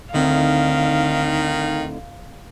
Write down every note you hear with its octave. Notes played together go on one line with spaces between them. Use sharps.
D2 D3 D#3 C4 D#4 E4 F5